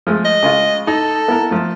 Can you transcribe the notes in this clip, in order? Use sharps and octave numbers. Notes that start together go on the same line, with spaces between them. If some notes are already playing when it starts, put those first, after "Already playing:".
F3 G#3 A3
D#5
C#3 G#3 F4
D#4 A4
B3 E4 A#4
F3 A3